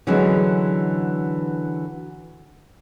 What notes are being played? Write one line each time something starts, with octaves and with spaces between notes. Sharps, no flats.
D3 E3 F#3 G#3 C#4